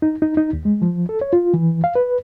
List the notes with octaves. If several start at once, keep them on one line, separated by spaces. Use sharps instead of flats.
D#4
D#4
D#4
D#2
G#3
F3
A4
C#5
F4
E3
F5
B4